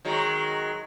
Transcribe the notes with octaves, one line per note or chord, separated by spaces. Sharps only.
D#3 F#3 G#3